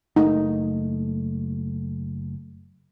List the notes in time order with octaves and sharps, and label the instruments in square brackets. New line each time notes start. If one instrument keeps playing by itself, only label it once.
[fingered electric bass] F#1 A3 [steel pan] D#4